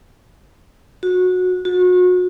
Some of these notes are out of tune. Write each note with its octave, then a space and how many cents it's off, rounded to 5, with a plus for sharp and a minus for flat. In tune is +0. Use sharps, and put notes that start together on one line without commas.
F#4 -20
F#4 -35